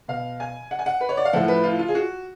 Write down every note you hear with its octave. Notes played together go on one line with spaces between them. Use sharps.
B2 F5
G#5
F#5
G#5
F#5
B4
C#5
D5
F5
A2 F3 F#5
B4
F4
F4
G#4
F#4